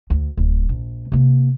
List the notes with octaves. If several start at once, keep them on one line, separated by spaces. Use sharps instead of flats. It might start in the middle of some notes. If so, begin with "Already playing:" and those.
D2
D1
A#1
C3 A#3